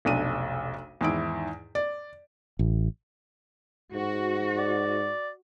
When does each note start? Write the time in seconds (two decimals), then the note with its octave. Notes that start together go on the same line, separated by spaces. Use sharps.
0.05 F1 B1 D4 D#7
1.01 E2 G#2 D#3 E4 D7
1.75 D5
2.59 A1
3.94 G#2 F#4
4.58 D5